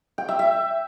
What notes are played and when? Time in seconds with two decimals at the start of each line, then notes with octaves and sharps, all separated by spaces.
0.18 G5
0.28 E5
0.39 E5